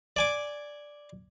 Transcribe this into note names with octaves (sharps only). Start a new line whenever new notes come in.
D5 G#5 D6